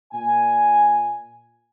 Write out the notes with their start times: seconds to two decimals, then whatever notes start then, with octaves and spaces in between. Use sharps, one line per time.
0.13 A#2 G#5